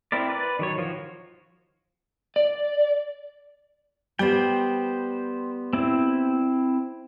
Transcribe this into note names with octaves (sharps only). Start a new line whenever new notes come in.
C4 E4 A#4 D5
B4 D5
D#3 F#3 C#5
F3 F#4
D5
G3 B3 C5 G5
C4 E4